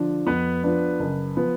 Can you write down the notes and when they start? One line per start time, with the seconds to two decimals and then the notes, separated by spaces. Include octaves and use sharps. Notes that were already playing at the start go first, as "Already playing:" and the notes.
Already playing: D3 F3 D4
0.26 F2 B3 B4
0.63 F3 B3 D4
1.00 F#1
1.36 F3 B3